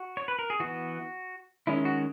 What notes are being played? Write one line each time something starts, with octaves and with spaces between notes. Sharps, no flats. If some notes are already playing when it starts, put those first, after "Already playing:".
Already playing: F#4
C#5
B4
A#4
G#4
E3 B3 F#4
D#3 G#3 C#4 E4
F#4